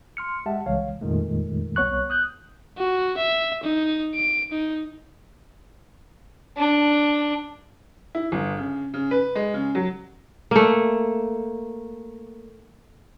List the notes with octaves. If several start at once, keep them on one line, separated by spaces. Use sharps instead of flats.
C6 F6 C#7
G#3 G4 E5 F#5 A5
C2 C#3 E3 G#3 C#5 F5
F2 A#2 D#3 G#3 A3
C2 B3 C#5 C#6 F#6
D#6 F#6 G6
F#4
E5
D#4
D7
D#4
D4
E4
G1
C#3
C#3
B4
G#3
C#3
F#3
A3 A#3